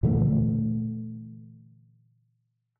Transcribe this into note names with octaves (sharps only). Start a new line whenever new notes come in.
A#2 D3 E3 A3